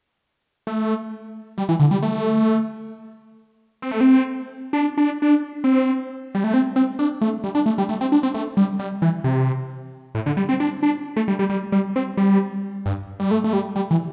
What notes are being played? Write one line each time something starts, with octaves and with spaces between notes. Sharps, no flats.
A3
G3
E3
D3
G3
A3
C4
A3
C4
D4
D4
D4
C4
G3
A3
C4
C4
D4
A3
G3
D4
A3
G3
A3
C4
D4
C4
A3
G3
G3
E3
C3
A2
D3
G3
C4
D4
D4
A3
G3
G3
G3
G3
C4
G3
G2
G3
A3
A3
G3
G3
E3